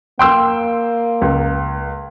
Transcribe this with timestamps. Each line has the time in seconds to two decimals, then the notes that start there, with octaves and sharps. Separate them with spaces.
0.19 A#3 G5 C6 E6
1.22 C#2